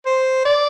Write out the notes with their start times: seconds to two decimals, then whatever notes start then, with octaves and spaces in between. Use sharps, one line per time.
0.06 C5
0.45 D5